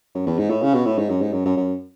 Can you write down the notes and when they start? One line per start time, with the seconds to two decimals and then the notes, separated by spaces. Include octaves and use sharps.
0.15 F#2
0.27 E2
0.39 G#2
0.50 A2
0.62 C#3
0.74 B2
0.86 A2
0.98 G#2
1.09 F#2
1.21 G#2
1.33 F#2
1.45 F#2
1.57 F#2